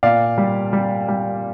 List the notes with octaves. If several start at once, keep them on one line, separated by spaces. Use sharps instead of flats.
A#2 D5 F5
G3
G3
G3